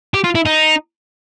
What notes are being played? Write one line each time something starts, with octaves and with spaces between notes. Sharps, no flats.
G4
F4
E4
D#4